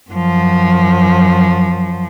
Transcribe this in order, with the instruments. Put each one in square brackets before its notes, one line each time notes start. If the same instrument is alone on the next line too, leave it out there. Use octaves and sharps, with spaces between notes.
[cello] F#2 F3